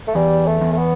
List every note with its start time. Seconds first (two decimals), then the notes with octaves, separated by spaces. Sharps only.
0.08 A3
0.15 E2 G3
0.46 A3
0.61 E2
0.72 A3
0.78 B3